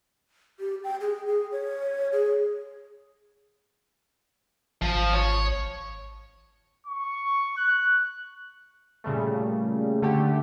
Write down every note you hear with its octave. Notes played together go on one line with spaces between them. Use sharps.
G4
G5
G#4
G#4
C#5
G#4
G#1 F3
C#5
C#6
F#6
A#2 C#3 G3 A3
D3 A3 G4